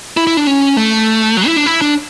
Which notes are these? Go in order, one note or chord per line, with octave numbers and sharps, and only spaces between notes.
E4
E4
D4
C#4
A3
F#3
E4
D4
E4
D4